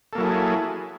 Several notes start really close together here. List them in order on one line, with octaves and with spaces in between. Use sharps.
A4 A#3 F#3 E4 G#4